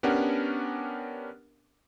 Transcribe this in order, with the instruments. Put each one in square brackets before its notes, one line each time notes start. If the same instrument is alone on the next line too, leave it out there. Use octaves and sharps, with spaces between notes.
[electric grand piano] B3 C#4 D4 G4 A#4 F#5